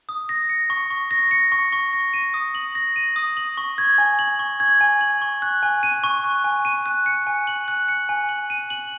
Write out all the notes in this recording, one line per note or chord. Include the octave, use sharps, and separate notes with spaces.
D#6
A#6
C#7
C#6
C#6
A#6
C#7
C#6
C#6
A#6
D#7
D#6
F#7
A#6
D#7
D#6
F#7
C#6
G#6
G#5
F#7
C#6
G#6
G#5
F#7
C#6
F#6
G#5
D#7
C#6
F#6
G#5
D#7
F#6
C#7
G#5
F#7
F#6
C#7
G#5
F#7
D#7
F#7